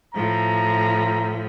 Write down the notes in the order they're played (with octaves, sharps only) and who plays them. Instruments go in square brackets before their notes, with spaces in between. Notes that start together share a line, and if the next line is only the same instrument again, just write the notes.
[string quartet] A2 F3 [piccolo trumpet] A#5